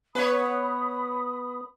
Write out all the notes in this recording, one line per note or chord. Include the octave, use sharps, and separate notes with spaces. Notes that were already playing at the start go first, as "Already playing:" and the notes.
B3 B4 C#5 B5 D#6